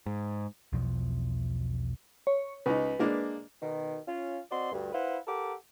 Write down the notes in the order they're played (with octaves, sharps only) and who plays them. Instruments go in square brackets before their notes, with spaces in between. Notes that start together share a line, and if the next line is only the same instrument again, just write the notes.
[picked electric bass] G#2
B1 E2 B2 F3
[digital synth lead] C#5
[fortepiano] C#2 D#4 [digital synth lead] B4
[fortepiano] G#3 A#3 D4
[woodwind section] B2 D#3
C#4 F4
C4 F#4 D5 D#5 C6
D2 G2
E4 B4 C5 F5 F#5
G4 A4 A#4 F#5 D6